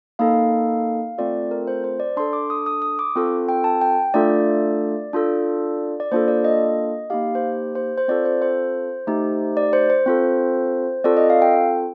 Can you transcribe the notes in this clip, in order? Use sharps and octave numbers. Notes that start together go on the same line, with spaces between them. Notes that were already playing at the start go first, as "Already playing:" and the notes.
A#3 D#4 A4 F5
A3 C4 F4 A4 D5
A#4
C5
C5
D5
D4 A4 C6
D6
D#6
D#6
D#6
D6
C4 F4 A4
G5
A5
G5
A3 D4 F4 A4 D5
D4 F4 A4
D5
A#3 D4 F4 A4 C5
D5
D#5
A#3 D#4 G4 F5
C5
C5
C5
C4 F4 A4 D5
C5
C5
A3 D#4 G4
D5
C5
C5
C4 F4 A4
C4 F4 A4 D5
D#5
F5
G5